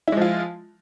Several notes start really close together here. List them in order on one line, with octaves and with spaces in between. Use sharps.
E4 G#3 F3 F4